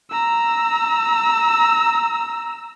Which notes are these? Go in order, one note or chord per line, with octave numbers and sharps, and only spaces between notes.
A#5 E6